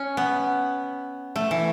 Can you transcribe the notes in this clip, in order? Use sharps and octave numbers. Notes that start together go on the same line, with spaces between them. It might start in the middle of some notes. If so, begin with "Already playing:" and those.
Already playing: C#4
B3
A3
E3